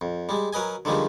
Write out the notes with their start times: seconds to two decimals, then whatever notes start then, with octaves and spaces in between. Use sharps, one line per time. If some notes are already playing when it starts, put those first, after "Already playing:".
0.01 F2
0.29 G3 G#3
0.53 F#3 A#4 B4 D#5 G#5
0.85 D3 D#3 F3 G3 G#3